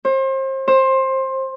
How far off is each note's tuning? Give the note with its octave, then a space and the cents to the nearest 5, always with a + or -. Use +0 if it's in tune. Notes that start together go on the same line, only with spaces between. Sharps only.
C5 +35
C5 +20